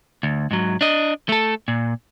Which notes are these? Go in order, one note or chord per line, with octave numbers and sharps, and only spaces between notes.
D2
G#2 F#3
D4 D#5
A3 A4
A#2